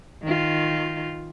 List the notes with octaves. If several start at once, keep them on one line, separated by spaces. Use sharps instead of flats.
D#3 F4